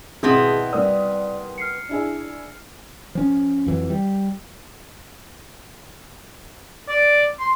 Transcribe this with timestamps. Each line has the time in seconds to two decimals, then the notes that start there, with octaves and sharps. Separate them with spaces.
0.23 G#1 B2 B3 C4 E4 G#4 D#6
0.73 C2 A#4 D5 D#6
1.58 F6 C7 C#7
1.89 D4 E4 G#4
3.15 F3 C#4
3.66 F2 E3 F#3
3.90 G3
6.89 D5
7.40 C6